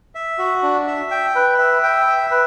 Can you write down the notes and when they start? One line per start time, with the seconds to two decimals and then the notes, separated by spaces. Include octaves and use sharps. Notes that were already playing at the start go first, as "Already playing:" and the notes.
0.15 E5
0.38 F#4
0.63 D4
0.87 E5
1.11 G5
1.35 B4
1.58 E5
1.83 G5
2.07 E5
2.31 B4